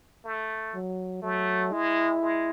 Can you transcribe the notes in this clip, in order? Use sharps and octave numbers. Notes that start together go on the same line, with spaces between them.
A3
F#3
F#3 A3
G#3 E4
G#3